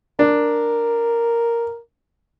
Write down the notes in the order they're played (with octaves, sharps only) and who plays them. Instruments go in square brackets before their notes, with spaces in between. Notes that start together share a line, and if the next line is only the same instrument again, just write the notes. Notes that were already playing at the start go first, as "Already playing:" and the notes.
[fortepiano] D4 [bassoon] A#4